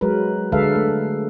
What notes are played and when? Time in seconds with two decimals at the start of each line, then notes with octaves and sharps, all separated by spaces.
0.01 F#3 G#3 A#4 B4
0.52 D3 G#3 A4 B4 E5 F5
0.75 A3